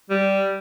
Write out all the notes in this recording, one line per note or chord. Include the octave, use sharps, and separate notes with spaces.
G3